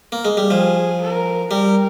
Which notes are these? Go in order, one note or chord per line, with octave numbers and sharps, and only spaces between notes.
A#3
G#3
G3
F3 G#4
A#4
G3 A#4